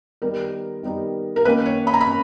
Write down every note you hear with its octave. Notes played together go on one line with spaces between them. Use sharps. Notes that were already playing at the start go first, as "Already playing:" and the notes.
D#3 G3 B3 D#4 A#4
D#3 G3 B3 D#4
A#4
D#3 A#3 C#4 B4
C#5
B5
A#5
B5
C#4